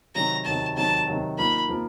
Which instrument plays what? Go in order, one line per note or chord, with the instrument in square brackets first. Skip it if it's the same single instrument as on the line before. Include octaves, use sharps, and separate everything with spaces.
[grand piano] C3 D#3 F#3 [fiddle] A#5
[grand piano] C3 D#3 F#3 [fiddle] A5
[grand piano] C3 D#3 F#3 [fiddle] A5
[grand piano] C3 D#3 F#3
[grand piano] F3 A#3 D#4 [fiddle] B5
[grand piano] F3 A#3